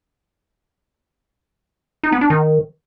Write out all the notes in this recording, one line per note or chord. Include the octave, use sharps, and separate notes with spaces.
D#4
B3
D4
D#3